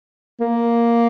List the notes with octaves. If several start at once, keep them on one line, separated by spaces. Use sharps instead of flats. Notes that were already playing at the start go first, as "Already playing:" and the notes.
A#3